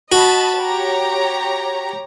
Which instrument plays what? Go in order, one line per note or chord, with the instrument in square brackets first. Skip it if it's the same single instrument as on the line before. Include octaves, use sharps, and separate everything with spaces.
[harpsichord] F#4 [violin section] D#5 A5 B5
[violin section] G4 C#5 A#5